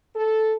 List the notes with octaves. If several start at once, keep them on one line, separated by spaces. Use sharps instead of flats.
A4